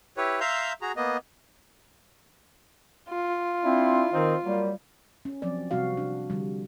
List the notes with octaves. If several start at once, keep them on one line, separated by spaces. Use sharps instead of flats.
E4 G4 B4 C#5
E5 F5 A#5 C6 E6 G6
F#4 G#4 A#5
A#3 B3 D#5
F4
C4 D4 E4
D#3 C4 D#4
F#3 G3 A#3
C#4
F3 F#3 C4 D5
C3 G3 C4 F#4 F5
D4
D3 F3 G3